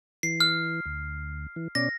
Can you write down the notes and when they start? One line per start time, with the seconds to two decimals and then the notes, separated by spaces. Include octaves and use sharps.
0.23 E3 C7
0.40 F6
0.86 D2
1.56 E3
1.75 B2 C#4 D5 A#6